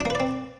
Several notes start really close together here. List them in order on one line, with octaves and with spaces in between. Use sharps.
D4 A#3 B4 D5 C4